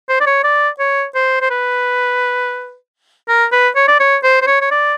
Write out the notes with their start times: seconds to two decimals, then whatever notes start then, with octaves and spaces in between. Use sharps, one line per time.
0.09 C5
0.20 D5
0.26 C#5
0.44 D5
0.79 C#5
1.15 C5
1.41 C5
1.50 B4
3.28 A#4
3.52 B4
3.76 C#5
3.88 D5
4.00 C#5
4.23 C5
4.42 C5
4.47 C#5
4.61 C#5
4.71 D5